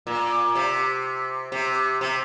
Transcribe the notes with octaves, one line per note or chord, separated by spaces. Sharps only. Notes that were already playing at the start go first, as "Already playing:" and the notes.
A#2
C3
C3
C3